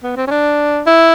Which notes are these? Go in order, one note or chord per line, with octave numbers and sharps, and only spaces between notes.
B3
C4
C#4
D4
E4